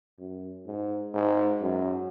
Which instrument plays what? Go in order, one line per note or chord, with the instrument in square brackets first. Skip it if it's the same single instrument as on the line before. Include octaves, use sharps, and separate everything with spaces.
[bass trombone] F#2
G#2
G#2
F#2